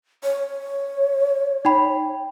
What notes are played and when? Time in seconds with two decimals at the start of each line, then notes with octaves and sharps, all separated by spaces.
0.24 C#5
1.65 D#4 G5 B5